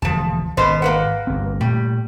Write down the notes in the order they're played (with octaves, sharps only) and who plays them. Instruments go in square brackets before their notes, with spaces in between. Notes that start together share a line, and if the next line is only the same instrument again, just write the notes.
[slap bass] E1 D2 [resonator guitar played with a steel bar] F3 A5
[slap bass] G#1 [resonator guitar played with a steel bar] B2 B3 C5
[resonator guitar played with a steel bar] A#3 B4 F#5
[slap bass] G1 C4
[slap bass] A#2 A3 [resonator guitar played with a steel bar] G3